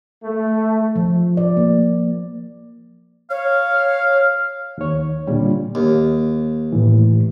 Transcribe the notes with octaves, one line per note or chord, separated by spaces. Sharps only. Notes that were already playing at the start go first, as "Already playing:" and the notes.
A3
F3
D5
A#3
C#5 F5
D#2 C#5
A#2 D3 G3
D#2
A2 E3